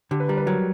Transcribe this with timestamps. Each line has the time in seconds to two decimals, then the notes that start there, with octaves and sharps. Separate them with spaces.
0.11 D3 G4
0.20 B4
0.28 G3 A#4
0.37 B4
0.46 F#3 A#4